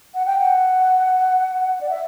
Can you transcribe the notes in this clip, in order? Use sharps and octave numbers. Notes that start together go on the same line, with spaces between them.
F#5
G5
F#5
D5
E5